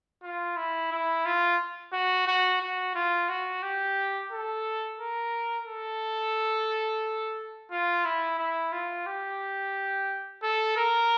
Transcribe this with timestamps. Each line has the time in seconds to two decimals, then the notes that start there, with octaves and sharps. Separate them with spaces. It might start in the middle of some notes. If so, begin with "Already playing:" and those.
0.23 F4
0.57 E4
0.92 E4
1.26 F4
1.93 F#4
2.27 F#4
2.61 F#4
2.95 F4
3.29 F#4
3.63 G4
4.32 A4
4.99 A#4
5.67 A4
7.71 F4
8.05 E4
8.39 E4
8.73 F4
9.06 G4
10.43 A4
10.77 A#4